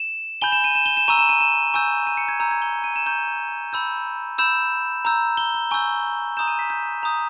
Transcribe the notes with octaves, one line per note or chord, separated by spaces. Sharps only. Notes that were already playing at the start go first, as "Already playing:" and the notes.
Already playing: E7
G#5 B5 G6 G7
E7
D#7
E7
G7
E7
A#5 C#6 E6 D#7
E7
D#7
E7
G#5 C#6 E6 G6
D#7
C#7
G#6
A#5 E6 G6
G#6
G7
D#7
E7
A#5 C#6 G6 G7
B5 E6 G6
B5 E6 G6 E7
A#5 E6 G6
G7
G7
G#5 C#6 E6 G6 G7
A#5 D#6 G6 E7
D#7
B6
G6
A#5 D#6 G6